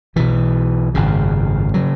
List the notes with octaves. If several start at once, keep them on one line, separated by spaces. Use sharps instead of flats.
B1 B2 E3
G#1 F#2 C#3
C#3 F#3